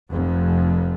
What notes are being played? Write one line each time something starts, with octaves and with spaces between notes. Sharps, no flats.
F1 F2